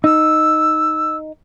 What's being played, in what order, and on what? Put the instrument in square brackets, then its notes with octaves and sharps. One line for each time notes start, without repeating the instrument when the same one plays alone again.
[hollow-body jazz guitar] D#4 [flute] E6